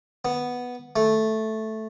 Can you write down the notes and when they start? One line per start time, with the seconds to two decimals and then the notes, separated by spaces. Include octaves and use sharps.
0.25 B3
0.96 A3